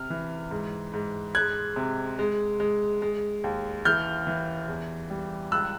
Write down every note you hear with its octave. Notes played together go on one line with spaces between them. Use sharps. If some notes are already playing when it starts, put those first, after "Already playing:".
Already playing: C3 F6
E3
G#2
G#2
G#3 F#6 G#6
C3
G#3
G#3
G#3
D#2
E3 F6 G6
E3
E2
G3
C#2 E6 F#6